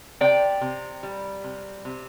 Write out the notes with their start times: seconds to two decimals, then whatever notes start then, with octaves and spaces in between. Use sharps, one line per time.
0.21 C3 D5 G5
0.61 C3
1.03 G3
1.44 C3
1.85 C3